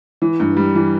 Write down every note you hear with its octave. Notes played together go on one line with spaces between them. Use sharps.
E3
G2
G3
E3